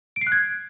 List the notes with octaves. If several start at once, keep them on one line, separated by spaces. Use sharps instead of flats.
D7
C7
F#6
G#6